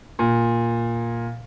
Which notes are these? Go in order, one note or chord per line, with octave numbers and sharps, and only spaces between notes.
A#2